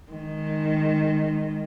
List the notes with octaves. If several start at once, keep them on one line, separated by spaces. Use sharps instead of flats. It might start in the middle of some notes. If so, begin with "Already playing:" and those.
D#3 G#3